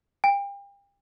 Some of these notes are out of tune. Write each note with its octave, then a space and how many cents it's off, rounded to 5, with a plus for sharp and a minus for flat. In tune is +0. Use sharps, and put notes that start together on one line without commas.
G5 +35